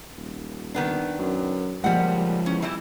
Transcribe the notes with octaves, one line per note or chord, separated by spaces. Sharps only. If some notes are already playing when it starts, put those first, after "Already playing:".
D#1
D#3 B3 D4
F#2
A#2 F3 G3 G#3 F#5
E2 C#4
E3 G3 E4